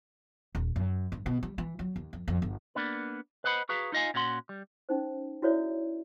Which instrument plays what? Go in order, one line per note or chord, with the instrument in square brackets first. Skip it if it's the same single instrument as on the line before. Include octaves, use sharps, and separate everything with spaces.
[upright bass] D#1
F#2
G2
B2
G3
E3
F#3
D#2
F2
F2
G1
[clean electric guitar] A#3 B3 D4 B4
B4 C5 D#5 F#5 B5
F#4 G#4 B4 F5 A#5
D#4 F4 D#5 F5 G#5
A#2 C#4 F#4 F#5 C6
G3
[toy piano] C#4 D#4 C5
E4 F#4 A4 C#5 D5 E5